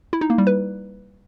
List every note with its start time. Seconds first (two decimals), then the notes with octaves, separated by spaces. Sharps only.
0.13 E4
0.21 D#4
0.30 A#3
0.38 G3
0.47 B4